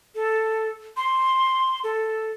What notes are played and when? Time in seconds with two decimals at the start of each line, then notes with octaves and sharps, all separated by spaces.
0.15 A4
0.97 C6
1.84 A4